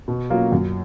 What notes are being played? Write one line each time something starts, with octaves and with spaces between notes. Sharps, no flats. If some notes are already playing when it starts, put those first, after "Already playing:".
B2
F#3 A#3 C#4 F4
F#2